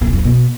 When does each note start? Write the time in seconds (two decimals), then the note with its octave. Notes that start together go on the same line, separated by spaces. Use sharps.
0.01 B2
0.07 C3
0.13 F2
0.19 A2
0.24 B2